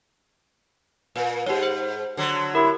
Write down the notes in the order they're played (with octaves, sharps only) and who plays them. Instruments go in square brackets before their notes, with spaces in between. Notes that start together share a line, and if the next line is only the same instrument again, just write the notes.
[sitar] A#2 [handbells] B4
[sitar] G#2 [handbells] G4 C#5
[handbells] C5
[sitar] D3 F#3
[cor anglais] E4 [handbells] G4 A#4